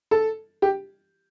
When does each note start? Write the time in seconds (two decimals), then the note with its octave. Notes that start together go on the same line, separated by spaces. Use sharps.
0.11 A4
0.62 G4